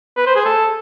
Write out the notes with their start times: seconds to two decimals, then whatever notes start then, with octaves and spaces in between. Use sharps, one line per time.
0.17 B4
0.26 C5
0.36 G#4
0.45 A4